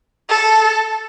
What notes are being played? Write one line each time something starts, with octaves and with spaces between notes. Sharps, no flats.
A4